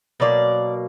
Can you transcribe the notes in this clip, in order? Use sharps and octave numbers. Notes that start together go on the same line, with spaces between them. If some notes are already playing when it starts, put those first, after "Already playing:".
B2 F#3 A#3 D5